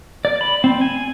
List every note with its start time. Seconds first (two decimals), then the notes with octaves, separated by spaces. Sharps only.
0.25 D5
0.41 B5
0.64 C4
0.81 G#5